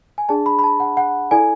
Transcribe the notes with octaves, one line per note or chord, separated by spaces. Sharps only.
G#5
D4 G#4 D5 A5
B5
B5
A5
F#5
F#5
E4 A4 D5 G#5